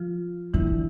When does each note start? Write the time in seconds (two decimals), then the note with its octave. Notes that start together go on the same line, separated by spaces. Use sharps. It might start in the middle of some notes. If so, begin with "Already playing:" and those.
Already playing: F3 F4
0.54 D3 E3 E4